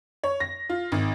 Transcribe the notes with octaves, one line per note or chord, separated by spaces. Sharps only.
C#5
A#6
F4
G#1